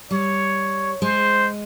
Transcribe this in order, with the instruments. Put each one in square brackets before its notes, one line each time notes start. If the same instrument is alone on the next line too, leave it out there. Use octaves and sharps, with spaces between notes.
[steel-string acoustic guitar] G3 [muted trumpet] C#5
[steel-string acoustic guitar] G#3 [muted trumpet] C5